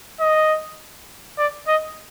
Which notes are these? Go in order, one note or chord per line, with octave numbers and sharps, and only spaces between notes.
D#5
D5
D#5